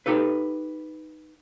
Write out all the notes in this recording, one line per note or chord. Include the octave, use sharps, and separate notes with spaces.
D#4 G4 A4 B4